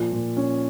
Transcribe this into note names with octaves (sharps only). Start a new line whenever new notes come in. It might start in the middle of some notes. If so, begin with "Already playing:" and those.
Already playing: A#2 F3
A#2
C#4